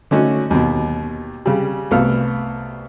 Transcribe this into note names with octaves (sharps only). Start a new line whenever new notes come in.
D3 A3 C#4 D#4 F#4
D#2 B2
C#3 G3
C2 A3 B3 A4 F5 F6